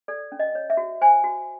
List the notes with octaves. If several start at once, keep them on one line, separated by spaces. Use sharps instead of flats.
A4 D5
C#4
D#5
C#5
E5
F#4
C5 G#5
F#4